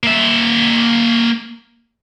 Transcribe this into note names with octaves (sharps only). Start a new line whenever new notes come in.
A#3 E5